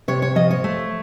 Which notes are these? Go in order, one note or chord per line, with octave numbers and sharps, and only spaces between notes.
C3 C#5
C#5
F3 D#5
C#5
A3